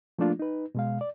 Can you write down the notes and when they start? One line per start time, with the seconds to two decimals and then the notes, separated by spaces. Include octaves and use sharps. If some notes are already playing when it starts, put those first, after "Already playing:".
0.19 F3 A3 A#3 D4 F4
0.39 D#4 B4
0.75 B2 G#3 F5
1.01 D5